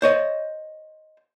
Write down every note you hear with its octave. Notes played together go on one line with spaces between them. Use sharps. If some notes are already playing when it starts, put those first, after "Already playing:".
C5 C#5 D#5